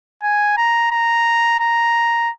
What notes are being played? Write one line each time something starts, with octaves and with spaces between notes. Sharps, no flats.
G#5
A#5
A#5
A#5